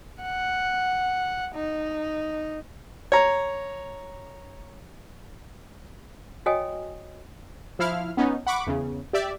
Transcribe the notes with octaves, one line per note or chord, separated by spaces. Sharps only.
F#5
D#4
C#5 A#5
F#4 C#5 D#5 G5 G#5 D#6
F3 E4 F5 F6
B3 C#4 D#4
F#5 B5 C#6 D6
E2 C#3
G4 D5 E5